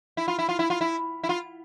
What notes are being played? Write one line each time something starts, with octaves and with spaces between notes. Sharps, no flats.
E4
F4
E4
F4
E4
F4
E4
E4
F4